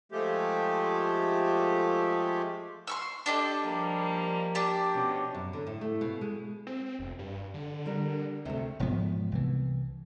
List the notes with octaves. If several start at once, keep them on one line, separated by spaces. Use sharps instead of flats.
F3 G#3 A3 G4
C6 C#6 E6
D4 G4 A4 D#5
F3 G3 A#3
D4 G4
B2 C#4
F#2
D3
A2
A3
B2
G#3
C4
F1
G2
D3
G3 D4 A#4
D2 C3 A3
E1 G#2 F3 B3
C2 E3